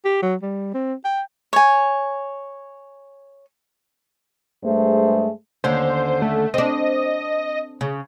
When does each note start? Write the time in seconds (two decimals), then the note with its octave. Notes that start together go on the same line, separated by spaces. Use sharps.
0.05 G4
0.22 F#3
0.42 G3
0.74 C4
1.05 G5
1.53 C#5 G#5
4.64 G2 G#3 A3 G#4 C5
5.64 D#2 D3 C#4 C5
6.22 A3
6.54 C4 D4 D#5
7.81 C#3